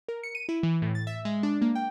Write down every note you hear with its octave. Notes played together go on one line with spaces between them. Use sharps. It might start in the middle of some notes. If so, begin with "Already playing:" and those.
A#4
C#7
D#7
E4
E3
A2
A6
E5
G#3
D4
A#3
G5